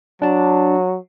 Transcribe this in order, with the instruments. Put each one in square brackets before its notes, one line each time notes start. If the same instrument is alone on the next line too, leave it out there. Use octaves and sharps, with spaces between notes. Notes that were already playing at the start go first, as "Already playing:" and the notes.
[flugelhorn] F#3 [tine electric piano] D4 A5